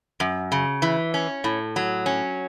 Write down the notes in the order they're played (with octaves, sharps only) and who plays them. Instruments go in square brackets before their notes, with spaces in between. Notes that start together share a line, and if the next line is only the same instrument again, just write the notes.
[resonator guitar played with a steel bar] F#2
C#3
E3
C#4
A2
F#3
C#4